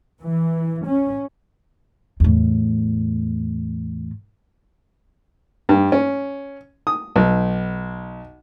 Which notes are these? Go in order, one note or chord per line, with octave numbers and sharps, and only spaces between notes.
E3
C#4
E2 A2
G2
C#4
D#6
B1